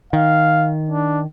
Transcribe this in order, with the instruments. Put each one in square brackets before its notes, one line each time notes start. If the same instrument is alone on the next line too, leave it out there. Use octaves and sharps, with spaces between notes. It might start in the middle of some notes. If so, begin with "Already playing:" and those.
[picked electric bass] D#3 [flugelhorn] F5
[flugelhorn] D4